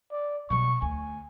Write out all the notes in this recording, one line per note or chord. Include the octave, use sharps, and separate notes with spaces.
D5
B2 G3 C#6
D2 G#5